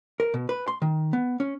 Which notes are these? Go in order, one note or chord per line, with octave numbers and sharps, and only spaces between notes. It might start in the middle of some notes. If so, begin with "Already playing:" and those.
A#4
B2
B4
C6
D#3
B3
C#4